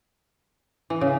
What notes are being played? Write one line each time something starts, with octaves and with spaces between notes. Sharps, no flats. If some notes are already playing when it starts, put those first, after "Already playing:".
E3
C#3